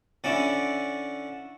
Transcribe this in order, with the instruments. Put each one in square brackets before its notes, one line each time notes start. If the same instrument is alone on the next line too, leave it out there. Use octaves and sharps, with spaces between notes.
[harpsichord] D3 C#4 E4 D5